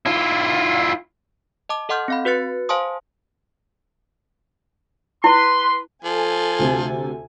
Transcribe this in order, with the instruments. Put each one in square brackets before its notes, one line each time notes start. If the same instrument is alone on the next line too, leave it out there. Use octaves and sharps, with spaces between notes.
[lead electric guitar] E4 F4
[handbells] D#5 A5 D6
A4 D#5 F#5 C6 F6 G6
C4 F5 B5
F#4 B4 F#6 A6 C#7
C5 F5 G#5 A5 C6 D#6
[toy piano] E4 [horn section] B4 C6
[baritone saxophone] F3 [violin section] A4 G#5
[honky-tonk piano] D2 C3